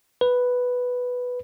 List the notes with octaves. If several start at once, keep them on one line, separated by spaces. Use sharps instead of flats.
B4